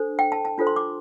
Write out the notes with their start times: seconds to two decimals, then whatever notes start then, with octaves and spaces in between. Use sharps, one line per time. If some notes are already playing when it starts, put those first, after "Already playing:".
Already playing: D4 A4 C5
0.19 G5
0.32 A5
0.45 A5
0.58 D4 F4 A4 C5
0.67 C6
0.76 D6